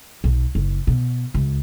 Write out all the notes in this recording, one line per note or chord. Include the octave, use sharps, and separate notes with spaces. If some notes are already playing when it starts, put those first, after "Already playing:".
B1
F#1
B2
C#2